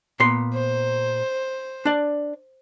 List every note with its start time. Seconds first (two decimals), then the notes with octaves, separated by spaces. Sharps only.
0.20 A#2 B3 C6
0.54 C5
1.85 D4 D5